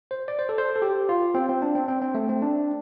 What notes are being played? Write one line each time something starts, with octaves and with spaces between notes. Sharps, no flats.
C5
D5
C5
A4
C5
A4
G4
F4
C4
C4
D4
C4
C4
C4
A3
C4
D4